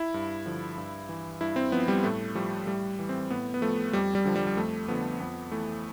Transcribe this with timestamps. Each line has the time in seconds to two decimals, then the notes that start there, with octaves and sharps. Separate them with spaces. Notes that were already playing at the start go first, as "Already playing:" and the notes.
Already playing: E4
0.14 G2
0.46 D3 F3
0.78 G2
1.09 E3
1.41 G2 E4
1.56 C4
1.72 F3 B3
1.88 G3
2.04 A2 A3
2.35 F3 G3
2.67 A2 G3
2.99 E3
3.09 C4
3.30 A2 B3
3.54 B3
3.61 F3 A3
3.93 F2 G3
4.15 G3
4.25 D3 F3
4.36 G3
4.47 G3
4.57 F2 A3
4.88 D3 F3 B3
5.20 F2 B3
5.52 E3 A3